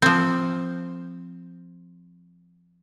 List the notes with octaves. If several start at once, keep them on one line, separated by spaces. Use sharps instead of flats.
F3 C4